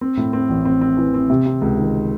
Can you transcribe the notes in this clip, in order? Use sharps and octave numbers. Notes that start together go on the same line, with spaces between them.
C4
A2
C4
A1
C4
C4
E3
C4
C3
C3
C#2
D#3